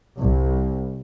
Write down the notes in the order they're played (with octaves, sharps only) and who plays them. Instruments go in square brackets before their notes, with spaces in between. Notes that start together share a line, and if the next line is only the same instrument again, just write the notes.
[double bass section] C2